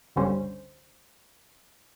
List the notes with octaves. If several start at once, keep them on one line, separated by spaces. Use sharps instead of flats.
G1 C#2 D3 G3 C#4 C5